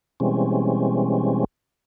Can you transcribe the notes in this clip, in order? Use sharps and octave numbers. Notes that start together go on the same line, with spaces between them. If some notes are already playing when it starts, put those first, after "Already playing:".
B2 E3 G3 G#3 C4 C#4